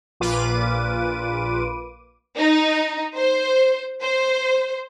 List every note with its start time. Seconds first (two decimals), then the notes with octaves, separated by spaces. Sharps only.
0.20 A#1 A#2 F4 B4 D6 D#7
2.37 D#4
3.15 C5
4.02 C5